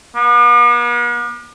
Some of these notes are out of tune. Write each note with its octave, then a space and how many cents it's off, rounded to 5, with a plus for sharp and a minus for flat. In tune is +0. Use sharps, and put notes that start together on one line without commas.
B3 -45